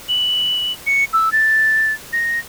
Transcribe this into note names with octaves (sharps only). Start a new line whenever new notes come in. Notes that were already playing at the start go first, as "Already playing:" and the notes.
F#7
C#7
E6
A6
A#6